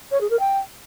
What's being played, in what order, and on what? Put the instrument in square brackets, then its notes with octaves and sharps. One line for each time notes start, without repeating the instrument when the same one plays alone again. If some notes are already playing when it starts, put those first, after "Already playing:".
[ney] C#5
G#4
A#4
G5